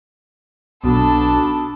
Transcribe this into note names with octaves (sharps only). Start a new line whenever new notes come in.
B1 B2 D4 A4 B5